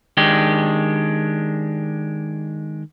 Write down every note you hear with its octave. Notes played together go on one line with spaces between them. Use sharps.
D#3 G#3 D4 G4